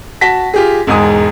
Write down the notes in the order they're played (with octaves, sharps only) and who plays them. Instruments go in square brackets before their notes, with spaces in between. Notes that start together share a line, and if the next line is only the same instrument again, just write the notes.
[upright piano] F#4 A5 A#6 B6
F4 G4 G#4
E1 G#2 G#3 G#5 D#6